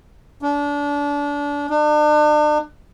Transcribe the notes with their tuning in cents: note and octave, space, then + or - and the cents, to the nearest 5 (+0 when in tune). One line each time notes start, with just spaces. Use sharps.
D4 -30
D4 +40